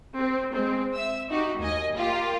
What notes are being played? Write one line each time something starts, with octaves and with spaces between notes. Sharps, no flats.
C4
G#3 C4
E5 E6
D#4 F#4 G4
D#2 D#5 G#5
A#3 F4 G4